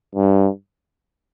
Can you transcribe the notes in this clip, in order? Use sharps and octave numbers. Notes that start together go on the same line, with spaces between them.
G2